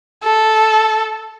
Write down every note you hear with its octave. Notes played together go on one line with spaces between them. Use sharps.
A4